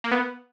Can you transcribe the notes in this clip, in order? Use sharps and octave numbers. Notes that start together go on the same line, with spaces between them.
A#3
B3